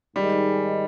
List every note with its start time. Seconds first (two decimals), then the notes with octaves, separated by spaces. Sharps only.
0.15 G#2 D#3 G3 G#3